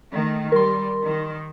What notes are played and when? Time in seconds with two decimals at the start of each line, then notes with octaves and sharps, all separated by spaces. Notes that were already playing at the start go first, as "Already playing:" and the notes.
0.12 D#3 A3
0.52 G3 A#4 C6
1.04 D#3